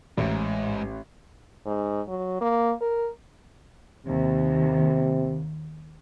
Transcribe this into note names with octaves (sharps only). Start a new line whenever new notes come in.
A1 G#2
G#2
F#3
A#3
A#4
D#2 C3